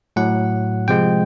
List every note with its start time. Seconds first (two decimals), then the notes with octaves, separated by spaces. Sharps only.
0.16 A2 F#3 F#5
0.88 C3 F3 G#3 G5